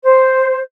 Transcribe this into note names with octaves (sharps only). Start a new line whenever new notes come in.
C5